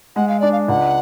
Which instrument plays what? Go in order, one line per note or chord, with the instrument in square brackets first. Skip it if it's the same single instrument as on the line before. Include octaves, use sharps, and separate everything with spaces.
[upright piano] G#3 [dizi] F#5
[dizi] F5
[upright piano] D4 [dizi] D5
[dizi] F5
[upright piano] C#2 [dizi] F#5